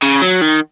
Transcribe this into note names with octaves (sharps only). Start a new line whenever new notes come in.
C#3
F#3
D#3